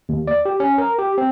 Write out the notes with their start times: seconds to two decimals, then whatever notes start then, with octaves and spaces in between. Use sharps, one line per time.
0.09 D#2
0.27 D5
0.45 G4
0.60 C#4
0.78 A#4
0.99 G4
1.18 C4